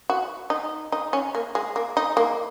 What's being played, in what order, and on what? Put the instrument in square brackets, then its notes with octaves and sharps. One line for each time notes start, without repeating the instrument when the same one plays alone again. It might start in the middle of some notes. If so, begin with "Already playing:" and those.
[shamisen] F#4
D#4
D#4
C#4
A#3
G#3
A#3
D#4
A#3